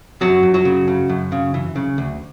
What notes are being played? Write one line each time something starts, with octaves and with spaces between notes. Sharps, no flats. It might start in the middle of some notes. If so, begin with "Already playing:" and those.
F#2 F#3 F#4
F#2
F#3 F#4
C#3
C#3
F#2
C#3
E3
C#3
D2